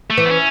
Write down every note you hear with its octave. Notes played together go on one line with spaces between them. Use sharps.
A3
E3
B3
C#4